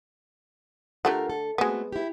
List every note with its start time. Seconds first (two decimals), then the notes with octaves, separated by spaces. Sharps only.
1.05 D3 A3 F4 G4 A#4 F#5
1.30 A4
1.58 G#3 A3 B3 C4 F#4
1.92 E4 G4